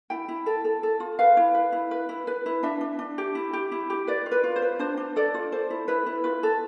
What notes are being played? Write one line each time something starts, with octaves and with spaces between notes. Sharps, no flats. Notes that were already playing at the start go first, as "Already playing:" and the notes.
E4 G5
E4
A4
A4
A4
F4
B4 F5
E4
B4
E4
B4
E4
B4
E4
D4 E5
D4
D4
G4
E4
G4
E4
G4
B4 D5
F4
B4
F4
C5
B4
D4 C5
D4
A4 D5
F4
A4 C5
E4
E4 B4
E4
F4 B4
A4